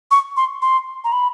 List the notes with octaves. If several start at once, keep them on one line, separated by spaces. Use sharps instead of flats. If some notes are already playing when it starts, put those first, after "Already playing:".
C#6
C6
C6
A#5
B5